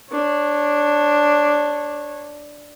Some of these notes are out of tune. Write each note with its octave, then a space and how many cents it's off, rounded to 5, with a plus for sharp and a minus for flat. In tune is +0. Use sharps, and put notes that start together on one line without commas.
D4 +0 C#5 -20